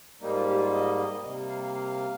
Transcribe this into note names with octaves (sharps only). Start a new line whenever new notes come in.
G#2 G3 A#3 D#4
F4
G4
F4
D#5
D#5
C3 G3 A#3 D#5
F5
F5
F5